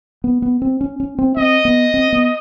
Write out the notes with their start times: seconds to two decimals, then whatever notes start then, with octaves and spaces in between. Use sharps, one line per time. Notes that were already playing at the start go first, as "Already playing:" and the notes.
0.24 B3
0.42 B3
0.62 C4
0.81 C#4
1.00 C#4
1.18 C4
1.37 C4 D#5
1.65 B3
1.94 C4
2.12 B3